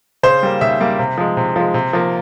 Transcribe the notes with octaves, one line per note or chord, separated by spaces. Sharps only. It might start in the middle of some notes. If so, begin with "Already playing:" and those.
C#3 C5
G3 A#3
C#3 E5
G3 A#3
C3
F3 G#3
C3
F3 G#3
C3
F3 A#3